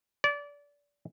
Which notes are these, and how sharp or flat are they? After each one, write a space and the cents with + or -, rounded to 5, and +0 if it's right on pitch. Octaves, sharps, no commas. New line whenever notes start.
D5 -25